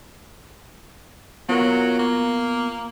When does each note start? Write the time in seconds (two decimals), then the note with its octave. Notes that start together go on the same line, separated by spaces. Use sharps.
1.49 F#3 B3 F4 A#4
1.99 A#3